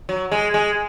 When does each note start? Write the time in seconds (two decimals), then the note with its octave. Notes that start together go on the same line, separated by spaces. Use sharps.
0.09 F#3
0.32 G#3
0.54 G#3